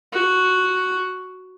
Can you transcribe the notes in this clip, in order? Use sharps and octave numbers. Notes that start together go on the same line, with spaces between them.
F#4